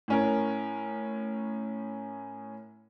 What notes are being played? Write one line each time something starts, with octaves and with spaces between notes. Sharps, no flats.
A2 C#4 A#4